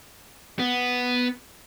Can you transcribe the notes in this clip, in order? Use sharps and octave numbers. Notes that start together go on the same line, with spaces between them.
B3